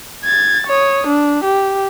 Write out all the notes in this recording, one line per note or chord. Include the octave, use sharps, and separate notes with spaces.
G#6 A6
C#5 D#6
D4
G4